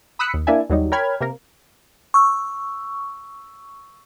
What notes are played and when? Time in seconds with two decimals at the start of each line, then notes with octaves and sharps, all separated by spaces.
0.19 B5 D#6 E6 F#6 B6 C#7
0.34 D#2
0.47 A#3 D4 E4 D5 E5 G#5
0.70 D#2 F#3 G3 D#4
0.92 A#4 C#5 G5 B5 F6 G#6
1.21 C3 A#3 A#4
2.14 C#6 E6